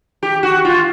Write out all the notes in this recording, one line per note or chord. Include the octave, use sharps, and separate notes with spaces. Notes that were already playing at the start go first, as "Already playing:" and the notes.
G4
F#4
F4